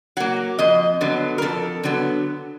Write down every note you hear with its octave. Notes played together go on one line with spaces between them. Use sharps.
F#3 A#3 F#5
F2 D#5
D3 F#3 B3
A#4
F2 A4
D3 F#3 B3